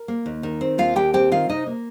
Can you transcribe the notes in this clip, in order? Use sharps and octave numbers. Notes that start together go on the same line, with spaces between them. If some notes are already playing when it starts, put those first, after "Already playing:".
Already playing: A#4
A#3
D#2
D#3
C4
D#2 F4 F5
D#2 G4 G5
C4 G4 G5
D#3 F4 F5
C3 D#4 D#5
A#3